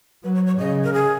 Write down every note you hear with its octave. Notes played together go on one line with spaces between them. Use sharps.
F#3 B4
C#5
C#5
C#3 D#5
A#4
G#4